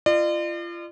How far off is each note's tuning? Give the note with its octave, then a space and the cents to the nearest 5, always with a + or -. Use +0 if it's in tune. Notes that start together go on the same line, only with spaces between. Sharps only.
F4 -30 D5 +45